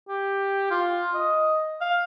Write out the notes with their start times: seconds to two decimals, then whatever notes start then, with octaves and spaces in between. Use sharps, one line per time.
0.08 G4
0.71 F4
1.14 D#5
1.81 F5